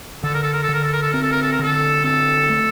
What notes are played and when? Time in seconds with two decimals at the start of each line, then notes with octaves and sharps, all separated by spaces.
0.23 D3 A4
0.34 A#4
0.43 A4
0.53 A#4
0.63 A4
0.69 D3 A#4
0.83 A4
0.93 A#4
1.03 A4
1.12 C4 A#4
1.23 A4
1.32 A#4
1.42 A4
1.52 A#4
1.59 D3 A4
2.04 C4 A4
2.49 A3